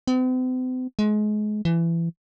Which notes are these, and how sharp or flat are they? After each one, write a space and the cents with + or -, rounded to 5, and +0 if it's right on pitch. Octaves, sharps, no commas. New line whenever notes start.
C4 -45
G#3 +30
E3 +25